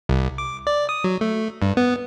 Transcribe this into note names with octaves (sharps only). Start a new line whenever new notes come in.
C2
D6
D5
D#6
F#3
A3
G2
B3